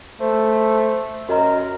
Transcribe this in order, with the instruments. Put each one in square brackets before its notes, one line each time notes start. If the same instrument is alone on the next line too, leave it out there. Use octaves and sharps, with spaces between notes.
[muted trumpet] A3 [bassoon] C5
[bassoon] F#2 [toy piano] F#4 D#5 A#5 [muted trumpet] A#4